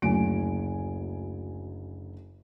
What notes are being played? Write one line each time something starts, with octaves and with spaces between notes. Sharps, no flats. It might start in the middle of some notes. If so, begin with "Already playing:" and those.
F#1 D2 G#5 D7